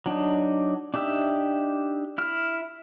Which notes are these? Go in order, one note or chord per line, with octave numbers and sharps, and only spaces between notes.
F#3 D4 D#4
D4 D#4 G4 E5
E4 F6